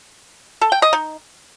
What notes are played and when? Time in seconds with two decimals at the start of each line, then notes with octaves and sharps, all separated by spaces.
0.61 A4
0.72 G5
0.82 D#5
0.93 D#4